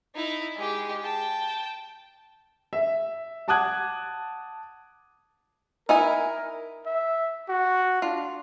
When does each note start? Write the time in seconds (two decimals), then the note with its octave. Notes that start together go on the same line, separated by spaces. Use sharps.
0.15 D#4 E4
0.56 G#3 G4
1.03 G5 A5
2.73 E5
3.48 F#5 A5 D6 D#6 F#6 G#6
5.89 D#4 E4 A#4 G#5
6.86 E5
7.49 F#4
8.02 D4 F4